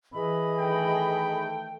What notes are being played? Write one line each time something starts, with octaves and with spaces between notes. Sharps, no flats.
E3 G#4 D#5 B5
D#3 A3 A4 G5